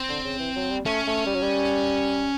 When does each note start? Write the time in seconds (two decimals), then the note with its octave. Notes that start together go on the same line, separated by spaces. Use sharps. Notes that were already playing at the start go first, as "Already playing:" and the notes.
Already playing: C4
0.09 D3
0.24 C#3
0.39 E3
0.56 F#3
0.70 G3
0.86 A3 C#4
1.07 A3
1.27 G3
1.35 F#3
1.42 G3